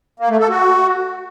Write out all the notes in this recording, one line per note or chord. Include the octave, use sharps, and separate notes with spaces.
A#3
A3
A4
F#4